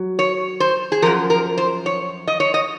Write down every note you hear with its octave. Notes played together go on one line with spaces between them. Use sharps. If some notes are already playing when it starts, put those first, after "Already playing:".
Already playing: F#3
C#5
C5
G#4
F#2 F3 A#4
A#4
C5
C#5
D#5
C#5
D#5